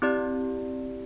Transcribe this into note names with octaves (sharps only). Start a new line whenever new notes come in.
C4 E4 G4 D5